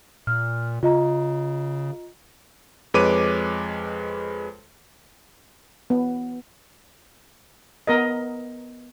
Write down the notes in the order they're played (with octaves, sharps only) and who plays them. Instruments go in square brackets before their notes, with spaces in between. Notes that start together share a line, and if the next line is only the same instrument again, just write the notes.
[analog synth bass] A#2 [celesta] F6
[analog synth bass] C#3 [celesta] F4 D#5 A#5
[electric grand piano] F2 G#3 B4 C#5 D6 D#7
[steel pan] B3
B3 A#4 D#5